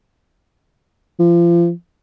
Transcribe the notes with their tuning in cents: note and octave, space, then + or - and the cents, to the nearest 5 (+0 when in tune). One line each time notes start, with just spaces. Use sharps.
F3 -30